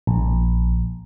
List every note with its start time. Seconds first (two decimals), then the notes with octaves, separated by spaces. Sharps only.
0.07 A#1